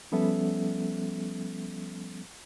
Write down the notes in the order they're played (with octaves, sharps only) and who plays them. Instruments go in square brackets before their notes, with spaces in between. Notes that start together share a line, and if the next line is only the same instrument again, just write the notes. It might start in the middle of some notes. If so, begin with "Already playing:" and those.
[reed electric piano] F3 G3 B3 C#4 A4 E5